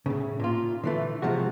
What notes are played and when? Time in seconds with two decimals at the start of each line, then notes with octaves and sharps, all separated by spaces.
0.06 A2 C#3
0.40 A#2 F4
0.84 D3 E3 A3
1.22 C3 F3 G#3 F#4